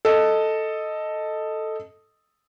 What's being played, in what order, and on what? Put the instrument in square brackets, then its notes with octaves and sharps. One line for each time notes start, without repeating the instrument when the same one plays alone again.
[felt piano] A4 D#5